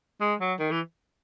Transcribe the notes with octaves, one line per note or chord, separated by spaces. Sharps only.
G#3
F#3
D#3
E3